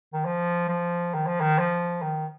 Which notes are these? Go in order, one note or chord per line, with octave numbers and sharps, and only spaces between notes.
D#3
F3
F3
D#3
F3
D#3
F3
D#3